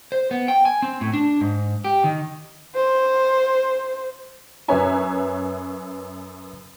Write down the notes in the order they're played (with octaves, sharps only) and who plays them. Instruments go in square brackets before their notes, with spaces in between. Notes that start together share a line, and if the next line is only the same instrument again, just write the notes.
[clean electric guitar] C5
B3
G5
G#5
C4
A2
D4
G#2
G4
D#3
[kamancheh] C5
[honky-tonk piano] F#2 B4 C#5 E5 G#5 A#5